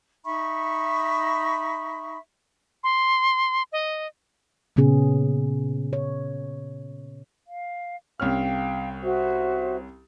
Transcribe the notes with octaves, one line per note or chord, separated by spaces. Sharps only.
D#4 E5 B5 C#6
C6
D#5
A#2 C#3 B3 C#4 G#4
C#5
F5
C2 C#4 F5 G5 F6
F#4 C5 E5